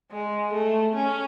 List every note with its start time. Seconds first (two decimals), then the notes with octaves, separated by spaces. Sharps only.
0.12 G#3
0.53 A3
0.96 C#4